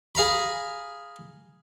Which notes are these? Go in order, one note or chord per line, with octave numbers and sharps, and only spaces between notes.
G#4 F5 A#5 B5